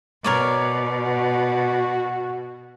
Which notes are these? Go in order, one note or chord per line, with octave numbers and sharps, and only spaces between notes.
B2 A#4 C#5 D5
F#4